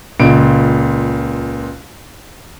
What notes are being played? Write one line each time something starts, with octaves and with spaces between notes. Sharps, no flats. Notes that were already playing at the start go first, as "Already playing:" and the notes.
C#2 A#2 D7